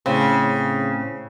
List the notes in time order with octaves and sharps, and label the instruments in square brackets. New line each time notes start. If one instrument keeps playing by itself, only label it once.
[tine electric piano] A2 C4 [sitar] C#3